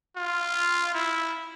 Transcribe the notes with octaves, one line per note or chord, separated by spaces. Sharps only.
F4
E4